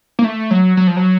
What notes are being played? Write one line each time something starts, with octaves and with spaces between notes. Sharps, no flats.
A#3
A3
F#3
F#3
F3
F#3